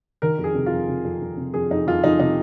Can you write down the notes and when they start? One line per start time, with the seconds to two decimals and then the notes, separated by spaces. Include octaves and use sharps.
0.22 D#3 A#4
0.38 F2
0.44 G#4
0.55 C3
0.66 F4
0.71 F2
0.88 C3
1.05 F2
1.21 F2
1.37 C3
1.54 F2 G#4
1.70 F2 D#4
1.87 F2 F4
2.04 F2 D#4
2.19 C3 D#4